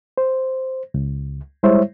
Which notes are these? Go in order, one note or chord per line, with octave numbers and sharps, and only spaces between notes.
C5
C#2
G3 G#3 E4 C5 C#5 E5